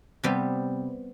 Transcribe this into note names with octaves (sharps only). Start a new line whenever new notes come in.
C3 G3 B3